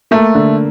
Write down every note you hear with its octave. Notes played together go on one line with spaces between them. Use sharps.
A3 A#3
D3